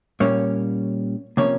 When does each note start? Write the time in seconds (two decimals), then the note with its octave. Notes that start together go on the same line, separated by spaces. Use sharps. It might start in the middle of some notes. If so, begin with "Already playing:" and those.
0.20 A#2 G3 A#3 C#4 C#5
1.37 C3 F3 A#3 C#4 C#5